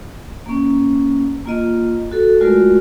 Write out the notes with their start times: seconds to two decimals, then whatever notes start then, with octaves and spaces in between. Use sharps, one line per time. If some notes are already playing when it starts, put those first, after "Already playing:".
0.46 A#3 C#4
1.45 A#3 F4 D#5
2.11 F#4 A4
2.41 G#3 A3 F4 F#4 A#4 D5